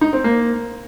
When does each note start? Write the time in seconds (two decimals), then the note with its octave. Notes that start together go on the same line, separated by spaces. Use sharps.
0.01 D#4
0.13 C4
0.24 A#3